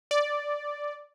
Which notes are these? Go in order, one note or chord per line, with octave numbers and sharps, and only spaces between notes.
D5